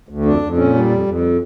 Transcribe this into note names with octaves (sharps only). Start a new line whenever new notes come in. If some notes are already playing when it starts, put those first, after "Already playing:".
D2
F2 D4
F2
A#2 C#4
G3
F2
F2